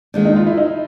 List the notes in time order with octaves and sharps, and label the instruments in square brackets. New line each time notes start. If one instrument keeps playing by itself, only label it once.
[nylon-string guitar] D#2 D#3 G#3 [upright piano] D4
[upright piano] D#4
F4
E4
D#4